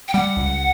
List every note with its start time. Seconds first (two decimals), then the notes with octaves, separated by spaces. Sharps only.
0.08 G5
0.14 G3 F#5
0.37 C#2